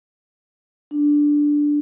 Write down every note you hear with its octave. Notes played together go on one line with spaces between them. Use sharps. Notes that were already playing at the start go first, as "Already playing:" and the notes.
D4